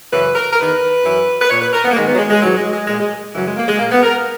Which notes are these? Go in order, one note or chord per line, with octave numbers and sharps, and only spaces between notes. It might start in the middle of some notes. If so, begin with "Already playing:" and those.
F#2 C#3 E3 B4
A#4
A#4
E2 D#3 B4
F#2 E3
B4
A#2 C#5
B4
A#4
B3
A#3
G#2 D#3 G#3
B3
F#3
G#3
G#3
G#2 E3 F#3
G#3
G#3
A#2 G#3
G#3
F#2 C#3 E3 F#3
G#3
A#3
G#3
A#2 A#3
B3
A#4